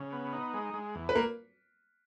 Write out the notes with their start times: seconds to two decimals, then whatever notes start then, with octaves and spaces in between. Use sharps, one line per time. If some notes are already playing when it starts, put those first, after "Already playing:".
Already playing: C#3
0.12 B3
0.33 D#4
0.54 G#3
0.74 G#3
0.95 E2
1.09 B4
1.15 A#3 A#4